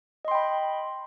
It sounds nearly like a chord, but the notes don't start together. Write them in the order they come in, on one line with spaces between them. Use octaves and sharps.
D#5 C6 G5 B5